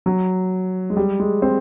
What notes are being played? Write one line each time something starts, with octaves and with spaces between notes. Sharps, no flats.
F#3
G#3
G3
G#3
C4